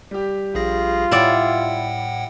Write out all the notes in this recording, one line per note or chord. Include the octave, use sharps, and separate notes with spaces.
G3 G4
A#1 F4 G#4 A#6
A2 E4 D5 F#5 G5